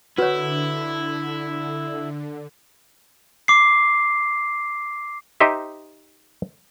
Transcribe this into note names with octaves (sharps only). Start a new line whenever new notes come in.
D3 E4 F#4 B4 C#5
D6 C7
D#4 G4 C5 D#5 E5